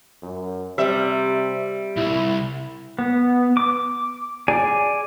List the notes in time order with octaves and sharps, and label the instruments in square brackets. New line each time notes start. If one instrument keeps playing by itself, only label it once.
[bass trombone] F#2
[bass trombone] C3 [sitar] G3 E5
[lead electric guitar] C2 [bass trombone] E4
[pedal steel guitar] B3
D6
G#4 D5 G#5